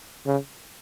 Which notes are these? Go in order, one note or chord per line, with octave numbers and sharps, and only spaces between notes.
C#3